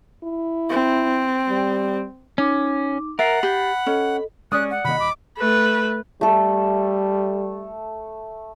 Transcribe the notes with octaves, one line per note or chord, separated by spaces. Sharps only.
E4
C4
G3
C#4 D#4 D6
A#4 E5 F#5 A6 C7
G4 B5
C#4 A4 D#5
G#3 C#4 D5 D#6 F#6
F#5
C3 D#3 A#3 D#5 B5 F#6
D#1 D6
A3 B4
G3 A3 A4